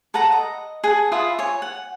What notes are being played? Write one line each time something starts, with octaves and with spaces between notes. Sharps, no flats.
A4 B4 F#5 A#5
D#5
G#4 F#5 A5
F4 B4 E5 D#6
C#5 G#5 C#6
F#5